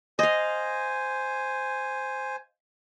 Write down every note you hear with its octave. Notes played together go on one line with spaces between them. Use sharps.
C5 D#5 F5 G#5